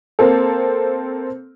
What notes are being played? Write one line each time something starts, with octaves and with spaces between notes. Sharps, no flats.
A#3 C4 A4